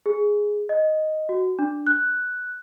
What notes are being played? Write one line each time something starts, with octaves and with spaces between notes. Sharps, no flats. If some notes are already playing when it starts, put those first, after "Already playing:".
G#4
D#5
F#4
D4
F#6